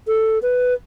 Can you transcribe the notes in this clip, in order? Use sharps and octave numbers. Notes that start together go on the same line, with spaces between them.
A4
B4